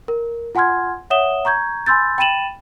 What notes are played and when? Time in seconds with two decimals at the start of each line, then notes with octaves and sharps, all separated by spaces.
0.08 A#4
0.55 F4 F#5 G#5 C6 F6 G#6
1.10 C#5 E5 F#5 D#6 E7 G7
1.45 A#5 C#6 G6 G#6
1.86 G#5 B5 C6 E6 G6 A6
2.18 G5 B5 A6 D#7 E7 F#7